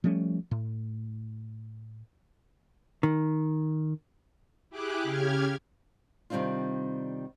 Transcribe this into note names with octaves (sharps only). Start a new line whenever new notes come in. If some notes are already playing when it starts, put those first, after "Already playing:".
F3 G3 A3 C#4
A2
D#3
E4 G4 G#4 D6 F#6
C#3 G4 F6 G#6
C3 D#3 G3 C4 D4 F4